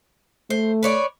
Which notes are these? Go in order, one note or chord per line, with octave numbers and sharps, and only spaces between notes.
A3 C5
B4 C#5 D5